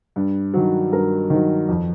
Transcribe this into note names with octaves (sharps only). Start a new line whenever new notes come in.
G2
D#3 F#3
G2 A#4
D#3 F#3
F2